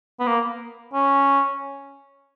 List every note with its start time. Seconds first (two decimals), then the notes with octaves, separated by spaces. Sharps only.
0.20 B3
0.27 A#3
0.93 C#4